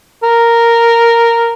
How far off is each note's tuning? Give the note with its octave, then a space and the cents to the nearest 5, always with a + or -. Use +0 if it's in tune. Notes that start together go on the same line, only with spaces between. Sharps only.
A#4 -5